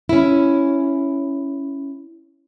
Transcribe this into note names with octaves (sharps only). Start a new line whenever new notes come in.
C#4 E4